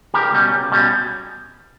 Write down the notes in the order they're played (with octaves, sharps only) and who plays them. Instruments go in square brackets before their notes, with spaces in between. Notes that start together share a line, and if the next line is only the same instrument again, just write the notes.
[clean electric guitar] C#2 G4 A#4
B2 G3 C#4
C#2
B2 G3 C#4